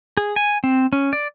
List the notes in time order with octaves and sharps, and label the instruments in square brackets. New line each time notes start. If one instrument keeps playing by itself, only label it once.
[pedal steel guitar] G#4
G#5
C4
C#4
D5